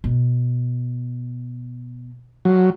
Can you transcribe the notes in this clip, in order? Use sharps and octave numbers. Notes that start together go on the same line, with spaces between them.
B2
F#3